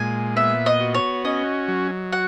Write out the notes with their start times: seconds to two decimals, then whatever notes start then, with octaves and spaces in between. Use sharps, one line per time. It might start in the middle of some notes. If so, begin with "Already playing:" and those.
Already playing: A#2 G#3 G#5
0.36 B3 E5
0.66 D#5
0.80 F#4
0.94 C#5
1.24 C#4 D#5
1.68 F#3
2.12 F#4 F#5